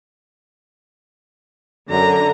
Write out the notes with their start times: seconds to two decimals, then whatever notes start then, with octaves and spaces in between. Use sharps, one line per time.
1.90 F#2 D3 A#5